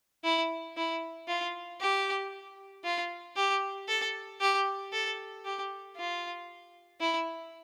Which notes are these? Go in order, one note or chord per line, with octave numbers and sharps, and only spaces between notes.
E4
E4
F4
G4
F4
G4
A4
G4
A4
G4
F4
E4